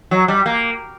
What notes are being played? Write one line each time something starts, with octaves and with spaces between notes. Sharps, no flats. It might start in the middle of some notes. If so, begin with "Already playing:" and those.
F#3
G3
A#3